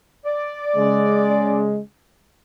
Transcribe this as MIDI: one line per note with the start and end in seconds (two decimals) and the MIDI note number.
0.25 1.67 74
0.76 1.78 49
0.76 1.78 56